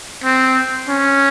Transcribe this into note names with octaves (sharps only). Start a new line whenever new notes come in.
C4
C#4